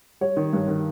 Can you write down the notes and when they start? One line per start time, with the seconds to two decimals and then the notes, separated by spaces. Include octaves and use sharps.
0.21 G3 C#5
0.37 D#3
0.53 G2
0.68 D#3